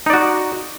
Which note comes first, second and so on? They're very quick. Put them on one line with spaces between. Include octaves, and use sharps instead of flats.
D#4 D5 F#4